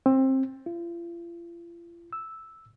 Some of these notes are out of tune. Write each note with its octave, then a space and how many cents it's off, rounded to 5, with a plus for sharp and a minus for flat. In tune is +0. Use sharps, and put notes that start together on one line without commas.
C4 +20
F4 -40
E6 -5